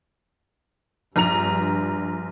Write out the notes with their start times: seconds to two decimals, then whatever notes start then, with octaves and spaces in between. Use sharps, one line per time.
1.16 A#1 G2 A#5 F7